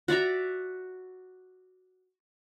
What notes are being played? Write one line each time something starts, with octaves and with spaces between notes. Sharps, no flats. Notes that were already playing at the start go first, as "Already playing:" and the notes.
F#4 D5 E5 A#5